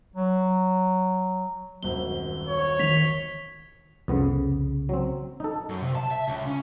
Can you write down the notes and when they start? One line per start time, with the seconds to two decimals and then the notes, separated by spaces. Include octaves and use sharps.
0.16 F#3
1.83 D#1 G#1 F#2 G7
2.48 C#5
2.79 D#3 B6 F7
4.08 C2 F2 C#3 B3
4.89 F#3 C4
5.40 D#4 A4
5.69 F#2
5.83 C3
5.95 A5
6.11 E5
6.27 C#2
6.46 C#4